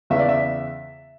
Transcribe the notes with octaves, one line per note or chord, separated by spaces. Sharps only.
E2 C#3 E3 E5
D5
E5